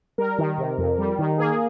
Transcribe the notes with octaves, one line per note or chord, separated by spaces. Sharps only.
G3 A#4
D#3
C3
F2
G3
D#3
A#3 G#4